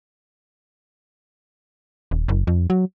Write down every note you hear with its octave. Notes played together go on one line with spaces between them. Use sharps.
D#1
F#1
F2
F#3